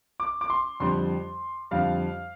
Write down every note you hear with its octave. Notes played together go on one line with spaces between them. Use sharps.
D6
D6
C6
F2 D3 G3 C6
F2 D3 G3 F5